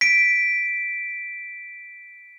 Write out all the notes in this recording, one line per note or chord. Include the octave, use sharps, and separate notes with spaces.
B6 D7